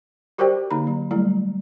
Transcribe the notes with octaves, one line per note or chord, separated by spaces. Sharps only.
F#4 G4 A#4 C5 D5 G5
D3 A#3 D#4 A#5 B5
F#3
F#3 G3 A3 E4